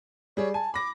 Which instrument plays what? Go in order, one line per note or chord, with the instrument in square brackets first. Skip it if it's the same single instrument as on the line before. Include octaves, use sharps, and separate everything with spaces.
[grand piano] G3 G#4 D5 [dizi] C#5
[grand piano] G#5 [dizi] A5
[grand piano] B5 A#6 [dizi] D6